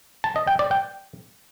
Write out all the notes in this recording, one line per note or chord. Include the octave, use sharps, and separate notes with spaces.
A5
D#5
G5
D5
G5